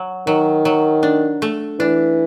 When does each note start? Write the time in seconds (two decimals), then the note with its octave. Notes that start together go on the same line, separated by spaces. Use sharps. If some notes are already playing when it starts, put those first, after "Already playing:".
Already playing: F#3
0.27 D#3 F#3
0.65 F#3
1.03 D4
1.42 A3
1.79 E3 D4